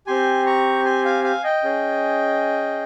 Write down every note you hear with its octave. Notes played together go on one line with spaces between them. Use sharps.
C4 G4 G#5 C6
A#5 C#6
G#5 C6
F5 G#5
F5 G#5
D#5 G5
C#4 G#4